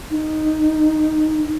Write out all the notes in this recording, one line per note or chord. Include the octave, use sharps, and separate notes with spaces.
D#4